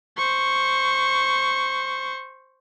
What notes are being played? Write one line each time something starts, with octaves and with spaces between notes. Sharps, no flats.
C5 C#6